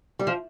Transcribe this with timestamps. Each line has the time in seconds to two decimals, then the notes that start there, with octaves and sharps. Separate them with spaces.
0.19 G3
0.27 F3